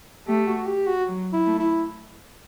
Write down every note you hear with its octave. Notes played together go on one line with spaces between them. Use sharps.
A3 G4
F#4
G4
F#4
F#3
E4
A3
E4